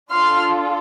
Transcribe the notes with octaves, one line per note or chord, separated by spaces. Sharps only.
D4 F4 A4 C6 F6